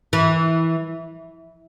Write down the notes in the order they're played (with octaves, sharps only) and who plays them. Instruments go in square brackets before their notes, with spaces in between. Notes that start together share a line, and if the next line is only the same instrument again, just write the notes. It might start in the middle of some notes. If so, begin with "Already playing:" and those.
[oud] E3